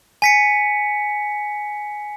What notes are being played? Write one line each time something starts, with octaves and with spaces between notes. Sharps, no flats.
G#5 B6 C#7